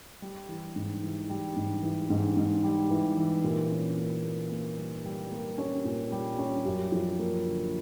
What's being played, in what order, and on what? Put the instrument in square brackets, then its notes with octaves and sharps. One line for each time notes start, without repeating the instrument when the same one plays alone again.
[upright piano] G3
E3
G#2
E3
G3
G#2
E3
G#2
G#2
G3
E3
E3
A#2
C#4
A#3
A#3
A#3
G3
G3
A#3
C#4
A#2
G3
C#4
F#2
F3
A#3
D3